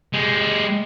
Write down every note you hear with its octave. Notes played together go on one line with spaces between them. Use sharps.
G#3 G4